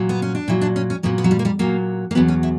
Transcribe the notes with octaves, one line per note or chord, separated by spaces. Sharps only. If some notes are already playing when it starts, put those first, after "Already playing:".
Already playing: A#2 F#3
B3
C#4
D4
A#2 F#3 E4
D4
C#4
C#4
A#2 F#3 B3
B3
F#3
G3
A#3
G3
A#2 F#3 A#3
A#3
E2 B2 F#3 B3
C#4
E4